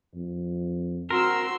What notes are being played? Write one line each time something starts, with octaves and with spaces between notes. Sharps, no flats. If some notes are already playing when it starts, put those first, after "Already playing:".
F2
C4 F#4 A#4 C6 E6